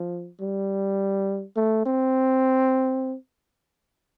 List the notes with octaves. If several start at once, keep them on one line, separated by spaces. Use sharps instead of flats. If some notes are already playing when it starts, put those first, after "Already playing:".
Already playing: F3
G3
A3
C4